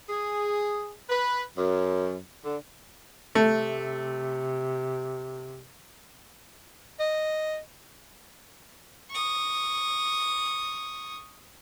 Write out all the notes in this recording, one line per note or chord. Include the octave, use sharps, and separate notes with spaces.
G#4
B4
F#2
D3
C3 A3
D#5
C#6 D#6